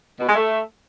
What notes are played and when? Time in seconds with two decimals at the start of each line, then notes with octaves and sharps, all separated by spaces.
0.19 B2
0.26 G#3
0.34 A3